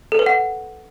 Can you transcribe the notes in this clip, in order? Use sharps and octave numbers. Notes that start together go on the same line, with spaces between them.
A4
B4
F#5